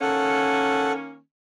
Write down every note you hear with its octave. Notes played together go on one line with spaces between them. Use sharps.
D#3 A#3 C#4 A4 F#5